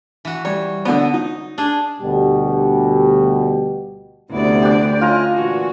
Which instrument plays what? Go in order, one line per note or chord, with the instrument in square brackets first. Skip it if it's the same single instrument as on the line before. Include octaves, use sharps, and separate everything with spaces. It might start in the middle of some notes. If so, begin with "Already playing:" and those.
[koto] E3 F#4
[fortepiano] G3 [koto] C#5
[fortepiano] D3 B3 [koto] D#5
[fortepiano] D#4
[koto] D4 G#4
[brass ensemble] D2 B2 G3 G4
[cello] D2 D5 [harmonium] C3 B3 E4
[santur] D4 G4
[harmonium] C#4 E4 D#5 [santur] F4 G#5 A#5
[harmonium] A#2 E3 [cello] F#4